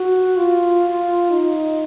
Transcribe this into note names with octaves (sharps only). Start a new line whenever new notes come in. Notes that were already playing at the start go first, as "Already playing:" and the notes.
Already playing: F#4
F4
D#4